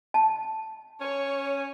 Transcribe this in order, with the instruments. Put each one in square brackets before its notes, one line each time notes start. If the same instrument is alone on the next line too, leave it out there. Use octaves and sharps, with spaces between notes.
[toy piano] A5
[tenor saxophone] C#4 [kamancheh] C#5